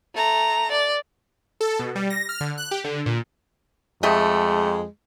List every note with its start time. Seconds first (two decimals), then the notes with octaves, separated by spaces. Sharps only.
0.15 A3 A#5
0.71 D5
1.61 A4
1.79 B2
1.95 G3
2.10 A#6
2.29 F6
2.41 D3
2.58 F#6
2.71 G4
2.84 D3
3.06 A#2
4.03 F2 G#3 A3 G4 D#5